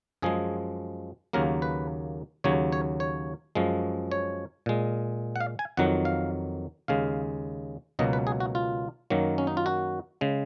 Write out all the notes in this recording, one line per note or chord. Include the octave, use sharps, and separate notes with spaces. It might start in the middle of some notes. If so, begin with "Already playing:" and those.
F#2 F3 G#3 G#4
D#2 C#3 F#3 A#3 A#4
B4
D#2 C#3 F#3 C#5
C#5
C#5
F#2 F3 G#3
C#5
A#2 G#3
F#5
F5
G#5
F2 D#3 F#3 F#5
F5
D#2 C#3 G#3 F5
C#2 B2 F#3 A#3 D#5
B4
G#4
F#4
F4
F#2 D#3 F#3 A#3
C#4
D#4
F4
F#4
C#3 G#3